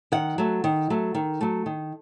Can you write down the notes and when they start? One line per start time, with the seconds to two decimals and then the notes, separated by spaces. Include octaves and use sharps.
0.12 D#3 F#5
0.38 F#3 A3
0.64 D#3
0.90 F#3 A3
1.15 D#3
1.41 F#3 A3
1.66 D#3